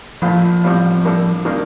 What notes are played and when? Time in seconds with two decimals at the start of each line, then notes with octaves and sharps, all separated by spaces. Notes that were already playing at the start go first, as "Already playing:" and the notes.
0.22 A#1 A#2 F3 A3
0.63 A1 A2 G3 C4 F4
1.04 A2 G3 A#3 D4 A4
1.45 C3 D#3 G3 A#3 D4